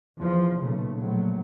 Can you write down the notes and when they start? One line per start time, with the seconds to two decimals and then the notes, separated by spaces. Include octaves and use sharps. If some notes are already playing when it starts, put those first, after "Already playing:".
0.19 E2 F3
0.57 B1 A#2 C#3 A3
0.95 A#1 F#3 A3